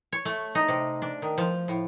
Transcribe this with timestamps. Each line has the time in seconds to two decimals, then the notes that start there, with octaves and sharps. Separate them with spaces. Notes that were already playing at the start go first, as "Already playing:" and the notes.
0.12 C#5
0.25 A3
0.55 D#4
0.68 C3
1.02 D4
1.22 D#3
1.38 F3
1.68 A2